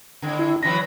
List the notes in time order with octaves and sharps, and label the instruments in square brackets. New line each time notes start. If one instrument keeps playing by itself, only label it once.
[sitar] A2 D3
[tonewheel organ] E4
[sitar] D3 E3 F#3 [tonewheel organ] B5 A#6